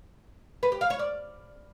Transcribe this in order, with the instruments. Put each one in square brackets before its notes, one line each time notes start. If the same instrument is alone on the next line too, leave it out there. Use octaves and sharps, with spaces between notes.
[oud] B4
G4
F5
C#5
D5